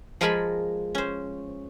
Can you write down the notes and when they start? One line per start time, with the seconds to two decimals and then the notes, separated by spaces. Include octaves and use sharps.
0.21 F3 G#3 A#4 G#5 A5 B5
0.95 C#4 C5